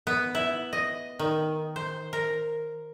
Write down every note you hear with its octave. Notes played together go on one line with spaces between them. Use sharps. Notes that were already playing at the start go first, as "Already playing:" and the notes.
B3
E4
D#5
D#3
C5
A#4